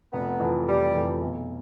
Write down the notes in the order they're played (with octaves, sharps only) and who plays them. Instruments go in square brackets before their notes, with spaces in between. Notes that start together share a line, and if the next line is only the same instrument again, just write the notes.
[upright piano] F1 [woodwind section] B3
[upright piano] F2 E3
[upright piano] F1 [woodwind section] G3
[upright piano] F2 E3
B1